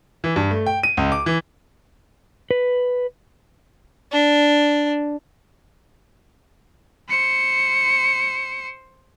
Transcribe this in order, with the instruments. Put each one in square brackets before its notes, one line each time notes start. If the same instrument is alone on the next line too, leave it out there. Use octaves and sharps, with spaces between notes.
[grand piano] E3
G2
A3
G5
D#7
C#2
D6
E3
[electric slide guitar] B4
[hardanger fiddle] D4
[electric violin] C5 C#7